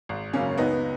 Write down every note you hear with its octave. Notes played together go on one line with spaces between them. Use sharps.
G#1
F#2 C#3 A#3 C#4
C#2 B3 D#4